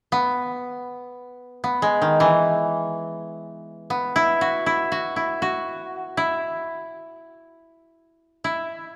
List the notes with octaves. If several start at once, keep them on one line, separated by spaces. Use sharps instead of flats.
B3
B3
G#3
D#3
E3
B3
E4
F#4
E4
F#4
E4
F#4
E4
E4